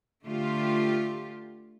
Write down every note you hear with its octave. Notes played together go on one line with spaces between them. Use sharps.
D3 A3 F4 G4